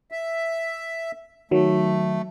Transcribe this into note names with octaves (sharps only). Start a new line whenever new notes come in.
E5
D#3 F#3 A3